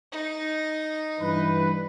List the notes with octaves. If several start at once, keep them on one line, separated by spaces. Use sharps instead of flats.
D#4
G2 E3 B4